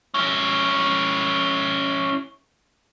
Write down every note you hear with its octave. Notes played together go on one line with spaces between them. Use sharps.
C#4 E4